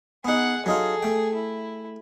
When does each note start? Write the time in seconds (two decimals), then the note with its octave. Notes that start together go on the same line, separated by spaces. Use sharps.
0.25 B3 D#4 G#4 F#5
0.66 F#3 D#4 F4 G#4 A4
1.02 A3 G5
1.35 E4